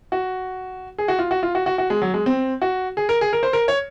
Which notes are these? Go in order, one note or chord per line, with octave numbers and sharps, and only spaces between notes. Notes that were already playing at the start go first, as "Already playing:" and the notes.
F#4
G#4
F#4
F4
F#4
F4
F#4
F#4
F#4
G#3
F#3
G#3
C4
F#4
G#4
A#4
G#4
A#4
C5
A#4
C#5